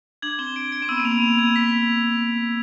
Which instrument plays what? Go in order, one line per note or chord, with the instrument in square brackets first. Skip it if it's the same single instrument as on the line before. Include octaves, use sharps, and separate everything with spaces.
[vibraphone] D4 [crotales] G#6
[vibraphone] C4 [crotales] G7
[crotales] D7
D7
[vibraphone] C4
[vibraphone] B3 [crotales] E6
[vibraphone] A#3
[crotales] F7
[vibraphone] B3
[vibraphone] A#3 [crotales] F7
[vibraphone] B3 [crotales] G#6
[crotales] B6